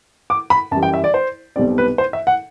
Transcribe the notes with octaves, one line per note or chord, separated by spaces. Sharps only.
D6
B5
F#2 E3 G3 A5
G5
E5
D5
C5
B1 B2 G3 C4 D5
B4
C5
E5
F#5